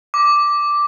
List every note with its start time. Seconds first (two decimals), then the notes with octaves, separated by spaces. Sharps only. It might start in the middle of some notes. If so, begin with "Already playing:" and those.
0.14 D6